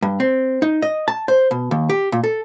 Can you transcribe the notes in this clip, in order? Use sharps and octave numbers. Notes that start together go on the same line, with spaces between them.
G2
C4
D#4
D#5
A5
C5
B2
D#2
G4
A#2
A4